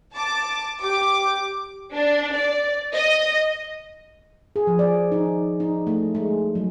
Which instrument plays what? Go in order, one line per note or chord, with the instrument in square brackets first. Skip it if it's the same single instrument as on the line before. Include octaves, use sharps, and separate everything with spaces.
[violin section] A5 D6
[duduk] G4 [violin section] D6
[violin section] D4
D5
D#5
[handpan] G#4
F3
D5
D#4
D#4
A3
G#3
F#3